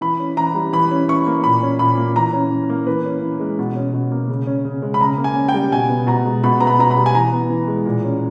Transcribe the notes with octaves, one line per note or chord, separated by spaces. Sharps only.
E3 B5
C#4
E3 A#5
G3
E3 B5
C#4
E3 C#6
A#3
A#2 B5
C#4
A#2 B5
A#3
E3 A#5
C#4
E3
A#3
E3 B4
C#4
E3
G#3
B2
C#4
B2
A#3
C#3
C#4
C#3
G#3
B5
C#3 A#5
A#3
G#5
C#4
G5
G3
B2 G#5
B3
B2 A#5
G#3
B2 B5
B3 A#5
B5
B2 A#5
B5
G3
G#5
E3 A#5
B3
E3
G#3
A#2
C#4